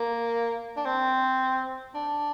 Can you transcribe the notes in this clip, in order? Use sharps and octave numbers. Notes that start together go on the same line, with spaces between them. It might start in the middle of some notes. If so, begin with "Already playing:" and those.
Already playing: A#3
D4
C4
D4